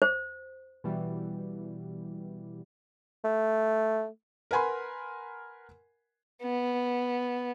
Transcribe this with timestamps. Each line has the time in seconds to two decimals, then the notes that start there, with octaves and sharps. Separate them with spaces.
0.02 C5
0.84 B2 E3 G3
3.24 A3
4.51 A#4 B4 F#5 G#5 B5 C6
6.43 B3